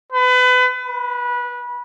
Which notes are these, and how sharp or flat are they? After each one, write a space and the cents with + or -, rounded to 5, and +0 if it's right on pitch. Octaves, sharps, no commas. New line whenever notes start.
B4 +30
B4 -20